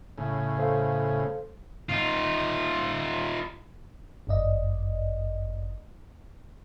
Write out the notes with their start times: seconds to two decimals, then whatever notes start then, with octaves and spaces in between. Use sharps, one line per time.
0.18 A2 C#3
0.58 A4 C5 F5
1.89 D#4 F4
4.27 G1 F#2 D5 D#5